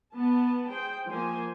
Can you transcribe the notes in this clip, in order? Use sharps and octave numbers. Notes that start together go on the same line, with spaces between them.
B3 A5
G#4 C5 G5
F3 A#3 C5 G#5